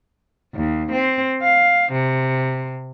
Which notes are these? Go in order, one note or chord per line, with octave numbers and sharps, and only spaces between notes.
D#2
C4
F5
C3